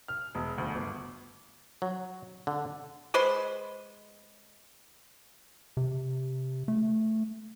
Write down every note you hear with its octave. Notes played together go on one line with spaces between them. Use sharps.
F6
E1
D2
G1
F#3
D3
G#3 B4 C5 C6
C3
A3